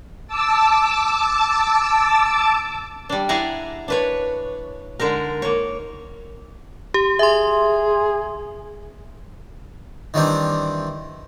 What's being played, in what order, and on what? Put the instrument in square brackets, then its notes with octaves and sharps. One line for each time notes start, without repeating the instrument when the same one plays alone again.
[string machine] A5 D6 E6
[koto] G3 D4
E4 G#4 D5 F#5 G#5 A#5
D4 B4 C#5
D3 G#3 D#4 A#4
A#3 C#5
[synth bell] G4
[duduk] G#4 [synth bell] E5 C6
[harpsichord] D#3 E3 G3 C4 D4